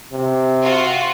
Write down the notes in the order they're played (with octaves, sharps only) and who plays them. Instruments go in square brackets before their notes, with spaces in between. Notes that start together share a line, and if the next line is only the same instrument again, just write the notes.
[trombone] C3
[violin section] F4 F#4